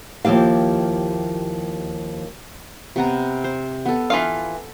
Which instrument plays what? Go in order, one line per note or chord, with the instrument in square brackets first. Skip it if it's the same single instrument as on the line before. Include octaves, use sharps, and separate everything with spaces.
[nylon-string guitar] D#2 F3 E4 G4 F5
[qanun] C3 B3 A#5
C5
B3 A4
[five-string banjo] E3 F4 F5